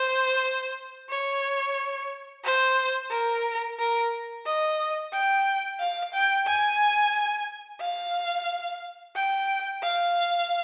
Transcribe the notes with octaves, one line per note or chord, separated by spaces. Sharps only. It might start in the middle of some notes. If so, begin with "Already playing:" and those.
Already playing: C5
C#5
C5
A#4
A#4
D#5
G5
F5
G5
G#5
F5
G5
F5